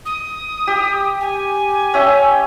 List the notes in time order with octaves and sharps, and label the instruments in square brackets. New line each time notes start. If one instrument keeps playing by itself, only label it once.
[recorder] D#6
[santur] G4
[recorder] G#5
[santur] C#4 E5 G5